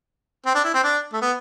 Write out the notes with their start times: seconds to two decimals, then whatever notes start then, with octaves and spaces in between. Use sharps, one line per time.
0.46 C4
0.55 D4
0.64 E4
0.74 C4
0.83 D4
1.13 A3
1.22 B3